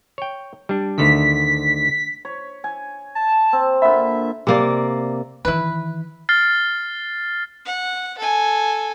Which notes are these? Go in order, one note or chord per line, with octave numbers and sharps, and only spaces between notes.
C#5 G5
G3 D4
D2 D3 D#3 B6
C#5
G#5
A5
C4
A#2 D3 E5 B5
C3 A#3 D5
D#3 E3 E4 B4
F6 A6 C7
F#5
A4 G#5